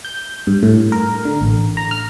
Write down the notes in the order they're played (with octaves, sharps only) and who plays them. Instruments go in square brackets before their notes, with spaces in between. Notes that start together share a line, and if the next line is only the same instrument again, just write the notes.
[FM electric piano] G6
G2
A2
A#4
D3
A1
A#5
F6